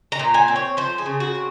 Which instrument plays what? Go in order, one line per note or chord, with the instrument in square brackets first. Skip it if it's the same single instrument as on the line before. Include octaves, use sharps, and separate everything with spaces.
[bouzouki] A#5
A#2
G#5
C4
C#5
F3 C5
G#4
C#3
F#4
C4